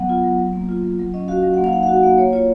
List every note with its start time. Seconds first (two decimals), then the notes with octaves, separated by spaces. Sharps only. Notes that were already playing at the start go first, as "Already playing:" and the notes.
Already playing: F#3 B3 F#5
0.09 F4
0.24 F#3
0.38 F#3
0.53 A#3
0.69 F4
0.83 F#3
0.99 F#3
1.14 C#4 D#5
1.28 F#4 F5
1.43 F#3 F5
1.54 A#3 F#5
1.64 F5
1.73 D#4 F#5
1.83 F5
1.88 F#4 F#5
2.03 A#3 F5
2.18 A#3 C#5
2.33 F4 C#5